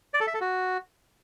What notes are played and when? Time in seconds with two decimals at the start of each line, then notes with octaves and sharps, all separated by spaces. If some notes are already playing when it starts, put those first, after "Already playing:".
0.14 D5
0.21 A4
0.27 E5
0.34 A4
0.41 F#4